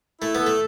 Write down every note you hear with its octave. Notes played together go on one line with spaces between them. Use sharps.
A3 E4
B3
A4
A3